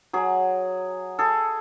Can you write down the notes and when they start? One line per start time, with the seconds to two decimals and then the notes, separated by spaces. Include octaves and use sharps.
0.13 F#3 G#4
1.19 G#4 A4